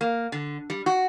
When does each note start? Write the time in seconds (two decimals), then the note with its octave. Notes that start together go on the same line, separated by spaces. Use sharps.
0.01 A#3
0.32 D3
0.70 G3
0.86 F#4